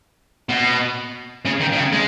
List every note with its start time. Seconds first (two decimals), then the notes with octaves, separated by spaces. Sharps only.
0.49 B2
1.46 C#3
1.61 D#3
1.73 D#3
1.77 C#3
1.93 G#3